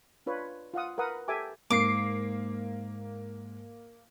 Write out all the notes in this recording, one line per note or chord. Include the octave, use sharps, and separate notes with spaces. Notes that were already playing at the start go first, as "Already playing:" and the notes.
D4 F4 B4 C#5
F4 F5 F#5 D#6
A#4 B4 F#5 D#6
G4 A4 E5 G#5 A5 D6
G#2 A#3 D6 C7